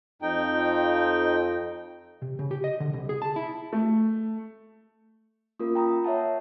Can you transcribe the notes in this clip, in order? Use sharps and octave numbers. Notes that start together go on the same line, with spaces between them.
F2 D#4 G5
C3
C#3
G4
D#5
D3
C2
G#4
A5
E4
A3
A#3 C#4 F4 A#4
G5 A#5 B5 D#6
C#5 E5 F#5 A5